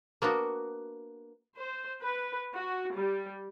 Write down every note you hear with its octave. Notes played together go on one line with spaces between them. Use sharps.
A#3 B3 D4 F#4
C5
B4
F#4
G3